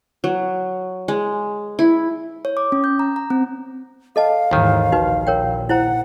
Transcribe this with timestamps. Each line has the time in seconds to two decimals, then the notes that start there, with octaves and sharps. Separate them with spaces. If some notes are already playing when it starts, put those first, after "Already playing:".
0.24 F#3
1.08 G#3
1.79 E4
2.45 C#5
2.57 D6
2.72 C#4
2.84 G6
2.99 A#5
3.16 A#5
3.30 C4
4.16 A4 D#5 F5 A5
4.51 D#2 G#2 D#3 E3
4.92 A#1 A#2 D#4 F#4 B4
5.27 A#4 C#5 G5
5.69 E4 C5 F#5 A#5